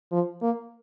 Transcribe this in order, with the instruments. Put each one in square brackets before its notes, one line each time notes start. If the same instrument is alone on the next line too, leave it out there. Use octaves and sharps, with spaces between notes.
[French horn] F3
A#3